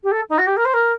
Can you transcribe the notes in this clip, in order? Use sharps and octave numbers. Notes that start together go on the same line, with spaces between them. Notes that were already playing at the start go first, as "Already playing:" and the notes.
G4
A4
D#4
F#4
G4
A#4
C5
A#4